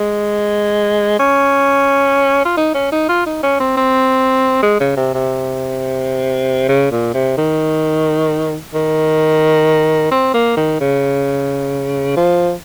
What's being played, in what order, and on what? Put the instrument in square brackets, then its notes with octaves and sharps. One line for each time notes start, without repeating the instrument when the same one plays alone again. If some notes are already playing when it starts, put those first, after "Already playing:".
Already playing: [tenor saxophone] G#3
C#4
F4
D#4
C#4
D#4
F4
D#4
C#4
C4
C4
G#3
C#3
C3
C3
C#3
A#2
C3
D#3
D#3
C4
A#3
D#3
C#3
F3